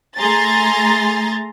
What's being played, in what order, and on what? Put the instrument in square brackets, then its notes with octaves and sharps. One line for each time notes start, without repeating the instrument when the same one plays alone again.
[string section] A3 G#4 A#5 C6 A6